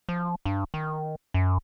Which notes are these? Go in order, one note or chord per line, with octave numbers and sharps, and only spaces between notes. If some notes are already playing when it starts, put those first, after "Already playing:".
F3
G2
D#3
F#2